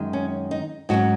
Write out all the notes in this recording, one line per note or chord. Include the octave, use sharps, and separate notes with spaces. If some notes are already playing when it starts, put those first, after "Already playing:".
Already playing: F#2 D#3 G#3
C#4
D#4
G#2 F#3 C#4 F#4